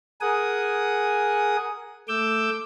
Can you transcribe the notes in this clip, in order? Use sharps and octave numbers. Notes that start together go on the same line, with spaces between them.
G#4 A#4 F#5 G#5 D#6
A3 D6 E6 G6